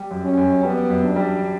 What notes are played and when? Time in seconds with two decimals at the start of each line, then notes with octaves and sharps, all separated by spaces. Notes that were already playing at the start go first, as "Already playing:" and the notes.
Already playing: G3
0.11 F#2
0.24 C#4
0.37 F#2
0.63 G3 B3
0.90 F#2
1.04 D4
1.16 G3